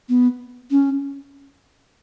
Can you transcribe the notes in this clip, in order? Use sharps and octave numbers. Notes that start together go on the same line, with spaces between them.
B3
C#4